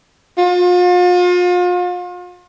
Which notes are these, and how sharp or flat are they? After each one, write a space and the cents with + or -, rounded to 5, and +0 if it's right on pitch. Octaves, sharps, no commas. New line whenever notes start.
F4 +40